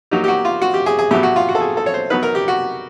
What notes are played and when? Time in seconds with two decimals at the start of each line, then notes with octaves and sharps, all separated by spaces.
0.11 F#3 A#3 D#4 G4
0.24 G4
0.28 F#4
0.45 F4
0.62 F#4
0.74 G4
0.86 G#4
0.99 G#4
1.11 A2 F#3 B3 G4
1.23 F#4
1.36 F4
1.49 F#4
1.55 A4
1.61 G#4
1.77 A4
1.86 C#5
1.94 C5
2.10 F#3 B3 D#4 B4
2.23 A#4
2.35 G4
2.48 F#4